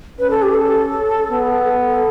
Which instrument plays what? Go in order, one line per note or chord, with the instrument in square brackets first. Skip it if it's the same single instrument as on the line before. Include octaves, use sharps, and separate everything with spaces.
[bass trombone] C#4 [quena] B4
[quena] A4
G4
A4
[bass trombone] B3
[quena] A4